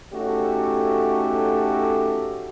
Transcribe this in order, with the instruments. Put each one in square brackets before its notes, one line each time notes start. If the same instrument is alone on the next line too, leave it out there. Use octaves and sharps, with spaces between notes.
[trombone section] A3 C#4 D#4 F#4 G4 A4